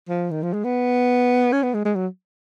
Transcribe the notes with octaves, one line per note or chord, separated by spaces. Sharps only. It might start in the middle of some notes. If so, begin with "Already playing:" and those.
F3
D#3
F3
G#3
B3
C#4
B3
G#3
G#3
F#3